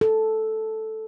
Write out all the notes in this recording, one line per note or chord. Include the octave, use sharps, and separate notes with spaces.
A4